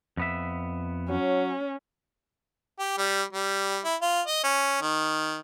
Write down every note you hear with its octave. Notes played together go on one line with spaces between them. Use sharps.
F2 B3 E5
F#3 C#4
G4
G3
G3
E4
F4
D#5
C#4
D#3